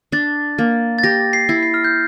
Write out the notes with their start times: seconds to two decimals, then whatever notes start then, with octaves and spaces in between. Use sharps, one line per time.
0.12 D4 A6
0.58 A#3
0.99 A6
1.03 G4 A#6
1.33 C7
1.49 E4
1.63 C7
1.74 F6
1.84 G6